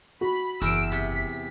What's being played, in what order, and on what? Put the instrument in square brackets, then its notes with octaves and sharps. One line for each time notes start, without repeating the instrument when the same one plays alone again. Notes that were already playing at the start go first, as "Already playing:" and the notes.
[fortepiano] F#4 [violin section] B5
[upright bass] F#1 [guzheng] E2 [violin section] E6 D7
[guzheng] C3 [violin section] B6